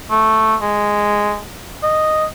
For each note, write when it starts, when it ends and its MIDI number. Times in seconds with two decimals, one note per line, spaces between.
0.11 0.55 57
0.62 1.39 56
1.83 2.26 75